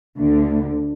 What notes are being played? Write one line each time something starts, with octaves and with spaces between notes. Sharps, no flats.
D2 D3